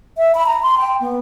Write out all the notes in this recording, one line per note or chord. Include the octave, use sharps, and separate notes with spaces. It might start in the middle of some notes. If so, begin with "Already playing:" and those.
E5
B5
A#5
C6
G5
B3